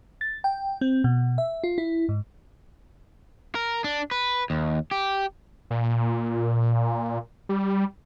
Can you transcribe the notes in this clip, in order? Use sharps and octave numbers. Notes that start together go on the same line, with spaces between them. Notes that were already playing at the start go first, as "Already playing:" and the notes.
A6
G5
C4
B2
E5
F4
E4
G#2
A#4
D4
B4
D#2
G4
A#2
G3